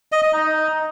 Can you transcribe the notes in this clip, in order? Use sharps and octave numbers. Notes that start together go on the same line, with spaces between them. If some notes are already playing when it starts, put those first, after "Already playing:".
D#5
D#5
D#4